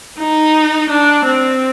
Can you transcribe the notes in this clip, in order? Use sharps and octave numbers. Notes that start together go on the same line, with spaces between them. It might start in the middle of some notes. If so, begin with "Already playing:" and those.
D#4
D4
C4